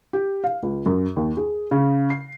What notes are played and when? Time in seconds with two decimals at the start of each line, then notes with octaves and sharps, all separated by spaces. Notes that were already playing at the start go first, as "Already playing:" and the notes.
0.13 G4
0.44 F5
0.63 C#2
0.86 F#2
1.16 D#2
1.37 G#4
1.71 C#3
2.10 C7